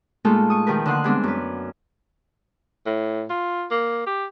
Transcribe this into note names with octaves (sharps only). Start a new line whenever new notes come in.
A#2 G#3 A3 D#4 F4 A4
C#6 D#6
D#3 F3 G4 A#4 B4
D3 D4 D#5 F#5 C6 F#6
E3 G3 G#3 B3 C4 D4
F#2 B4
A2
F4
A#3
G4